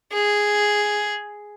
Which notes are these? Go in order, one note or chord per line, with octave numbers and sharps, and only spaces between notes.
G#4